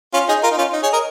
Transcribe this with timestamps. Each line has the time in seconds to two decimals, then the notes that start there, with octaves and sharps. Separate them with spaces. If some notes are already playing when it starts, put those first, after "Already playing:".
0.14 C#4 F4
0.29 D#4 G#4
0.43 F4 A#4
0.51 D#4
0.58 C#4 F4
0.73 D#4
0.82 G#4 C#5
0.92 A#4 D#5